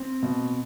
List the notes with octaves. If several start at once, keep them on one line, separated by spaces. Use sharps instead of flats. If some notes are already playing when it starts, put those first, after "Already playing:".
Already playing: C4
B2